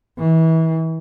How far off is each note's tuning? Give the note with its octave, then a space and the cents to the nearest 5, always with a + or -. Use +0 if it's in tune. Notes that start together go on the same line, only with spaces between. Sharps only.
E3 -30